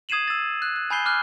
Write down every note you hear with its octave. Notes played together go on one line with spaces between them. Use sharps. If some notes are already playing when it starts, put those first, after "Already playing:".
D#6 G#6 C7 D#7 E7 F#7
E6 A6
F#6
F#6
G#5 B5 G6 C7 G7
D6 F6 F#6 C7